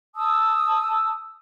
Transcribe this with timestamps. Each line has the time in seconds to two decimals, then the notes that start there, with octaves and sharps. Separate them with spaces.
0.16 A5 D#6 E6